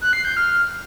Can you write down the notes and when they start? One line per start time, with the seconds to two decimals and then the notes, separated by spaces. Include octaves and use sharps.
0.01 F#6
0.13 C7
0.25 G6
0.37 F6